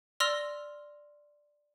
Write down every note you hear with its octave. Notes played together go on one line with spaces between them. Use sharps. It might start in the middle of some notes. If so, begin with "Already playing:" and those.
D5 C6 E6 F6 A#6 F7